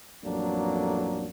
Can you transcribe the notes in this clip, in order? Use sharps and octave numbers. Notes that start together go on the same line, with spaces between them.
A1 F2 F#3 A#3 D4